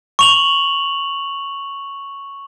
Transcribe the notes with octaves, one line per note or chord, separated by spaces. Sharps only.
C#6 F7 F#7